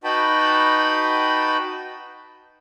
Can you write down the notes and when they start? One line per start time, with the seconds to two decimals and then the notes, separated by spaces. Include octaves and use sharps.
0.04 D#4 F#4 B4 G5 A5 B5